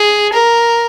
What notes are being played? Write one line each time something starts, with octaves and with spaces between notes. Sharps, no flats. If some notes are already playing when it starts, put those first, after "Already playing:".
Already playing: G#4
A#4